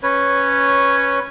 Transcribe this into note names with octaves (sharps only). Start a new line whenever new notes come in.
C#4 B4 C#5